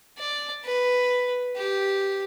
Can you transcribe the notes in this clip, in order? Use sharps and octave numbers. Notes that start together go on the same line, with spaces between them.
D5
B4
G4